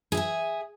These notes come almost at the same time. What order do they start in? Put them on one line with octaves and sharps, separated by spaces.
G#4 E5 G#5